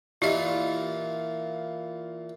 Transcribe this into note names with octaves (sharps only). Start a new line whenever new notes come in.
A#2 E3 E4 F4 G4 D#5